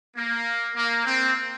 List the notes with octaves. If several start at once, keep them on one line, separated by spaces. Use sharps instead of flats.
A#3
A#3
C4